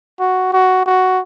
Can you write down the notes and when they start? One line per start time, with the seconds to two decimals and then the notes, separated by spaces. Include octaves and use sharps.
0.19 F#4
0.53 F#4
0.86 F#4